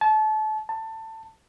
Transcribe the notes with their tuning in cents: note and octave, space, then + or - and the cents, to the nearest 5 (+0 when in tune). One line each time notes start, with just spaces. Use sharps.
A5 -30
A5 +20